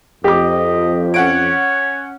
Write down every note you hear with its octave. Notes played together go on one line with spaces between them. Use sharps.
F2 G4 D#5 D6
C#4 C#5 F#5 D7